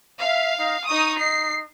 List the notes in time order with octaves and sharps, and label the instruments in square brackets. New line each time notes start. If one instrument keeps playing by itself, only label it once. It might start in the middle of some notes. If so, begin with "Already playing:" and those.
[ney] E5 [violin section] F5
[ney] D#4
[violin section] D#4 D#6 [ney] C#6
[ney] D#4 [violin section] C7